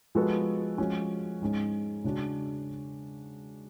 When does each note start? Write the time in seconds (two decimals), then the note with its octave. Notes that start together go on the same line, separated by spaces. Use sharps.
0.15 F3 G#3 B3 F#4 A4
0.78 F3 G#3 C#4 F#4
1.41 G#2 G#3 C#4
2.04 C#3 G#3 D4 F#4